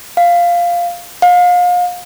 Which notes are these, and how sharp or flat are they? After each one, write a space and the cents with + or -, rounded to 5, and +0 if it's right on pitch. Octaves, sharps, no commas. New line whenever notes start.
F5 +0
F5 +35